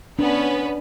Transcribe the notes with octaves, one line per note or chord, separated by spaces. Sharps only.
B3 C#4 D4 B4